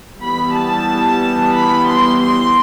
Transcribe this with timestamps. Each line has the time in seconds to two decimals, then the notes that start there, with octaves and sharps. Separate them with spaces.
0.22 E3 G3 B3 B5
0.55 A5
1.55 B5
1.88 C6
2.21 C6